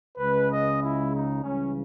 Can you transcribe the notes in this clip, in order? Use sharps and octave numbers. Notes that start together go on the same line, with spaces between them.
C#2 C#3 G#3 B4
D#5
E4
D#4
C#2 C#3 E3 G3 C#4